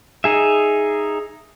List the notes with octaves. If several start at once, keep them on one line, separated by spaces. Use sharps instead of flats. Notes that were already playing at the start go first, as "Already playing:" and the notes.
D#4 G#4 E5